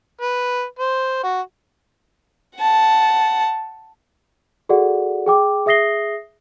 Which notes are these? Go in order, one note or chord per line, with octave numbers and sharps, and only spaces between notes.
B4
C5
F#4
F#5 A5
F#4 G#4 A4 D5 F#5
G#4 G5 D6
G#4 E5 D#6 A#6 C7 G7